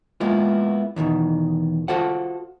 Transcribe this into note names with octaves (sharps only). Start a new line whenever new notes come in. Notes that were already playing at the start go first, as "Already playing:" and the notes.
G#3 A#3 B3 E4 F4
E2 B2 D#3 E3
F4 F#4 A4 C5 F#5